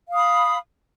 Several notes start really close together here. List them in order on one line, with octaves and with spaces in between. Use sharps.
F5 D#6 B5